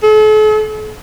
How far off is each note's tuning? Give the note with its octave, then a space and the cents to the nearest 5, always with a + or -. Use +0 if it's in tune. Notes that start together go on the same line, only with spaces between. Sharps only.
A4 -45